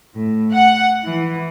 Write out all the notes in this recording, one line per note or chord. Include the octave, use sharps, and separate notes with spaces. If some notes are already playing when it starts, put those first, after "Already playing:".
A2
F#5
E3